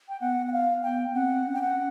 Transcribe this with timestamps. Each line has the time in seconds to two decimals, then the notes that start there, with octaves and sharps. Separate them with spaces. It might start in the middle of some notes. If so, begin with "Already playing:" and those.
0.09 G5
0.20 B3 F#5
0.47 F#5
0.52 F5
0.83 G5
1.14 C4 F#5
1.46 C#4
1.54 G5
1.62 F#5